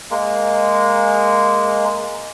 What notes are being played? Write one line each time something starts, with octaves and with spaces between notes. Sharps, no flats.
G#3 A#3